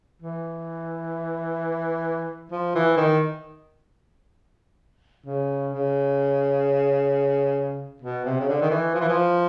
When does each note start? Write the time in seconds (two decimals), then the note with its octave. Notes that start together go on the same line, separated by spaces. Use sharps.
0.22 E3
2.51 F3
2.75 E3
2.97 D#3
5.26 C#3
5.74 C#3
8.02 B2
8.25 C3
8.40 C#3
8.49 D3
8.62 D#3
8.71 E3
8.94 F3
9.01 E3
9.09 F3